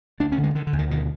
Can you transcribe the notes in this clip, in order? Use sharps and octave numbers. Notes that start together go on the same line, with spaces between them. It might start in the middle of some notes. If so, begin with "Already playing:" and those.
D2 D4
C#4
D3
G#3
D3 D#3
D3
D2
D#3
B2 D#3